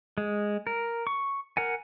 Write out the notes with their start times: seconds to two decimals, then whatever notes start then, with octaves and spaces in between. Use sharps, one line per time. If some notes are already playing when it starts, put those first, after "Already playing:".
0.18 G#3
0.67 A#4
1.07 C#6
1.57 A#4 F#5 G#5